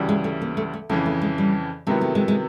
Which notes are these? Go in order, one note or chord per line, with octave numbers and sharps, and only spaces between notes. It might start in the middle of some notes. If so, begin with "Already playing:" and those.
Already playing: D2 C#3 E3 G3
G#3
A3
A#3
A3
A3
F2 C#3 E3 A3
A3
G#3
G3
C3 D#3 F#3 G#3 B3 E4
A3
G#3
G#3